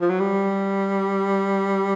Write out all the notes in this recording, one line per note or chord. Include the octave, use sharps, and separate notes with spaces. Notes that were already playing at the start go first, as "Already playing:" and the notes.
F3
F#3
G3